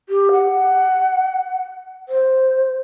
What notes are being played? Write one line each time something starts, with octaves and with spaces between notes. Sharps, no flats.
G4
F#5
C5